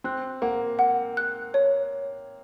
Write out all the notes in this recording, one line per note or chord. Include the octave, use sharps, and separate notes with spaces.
C4 F#6
A#3 F#5
F#5
F#6
C#5